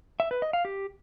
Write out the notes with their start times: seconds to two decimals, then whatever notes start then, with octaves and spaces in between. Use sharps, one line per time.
0.20 E5
0.31 B4
0.42 D#5
0.53 F5
0.65 G4